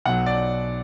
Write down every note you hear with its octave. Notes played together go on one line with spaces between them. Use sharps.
B1 B2 F#3 F#5
D5